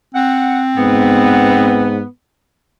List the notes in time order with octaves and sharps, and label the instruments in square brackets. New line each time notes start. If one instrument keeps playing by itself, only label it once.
[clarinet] C4 [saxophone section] F#5
[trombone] G#2 [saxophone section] B3